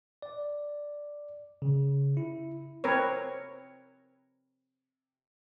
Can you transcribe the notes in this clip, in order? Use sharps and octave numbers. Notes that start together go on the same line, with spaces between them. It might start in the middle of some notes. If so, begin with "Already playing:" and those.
D5
C#3
E4
C4 A#4 B4 C#5